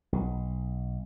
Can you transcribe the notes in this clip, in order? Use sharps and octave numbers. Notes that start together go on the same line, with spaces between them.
B1